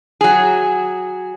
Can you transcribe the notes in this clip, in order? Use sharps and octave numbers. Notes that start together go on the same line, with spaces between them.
F#3 G#4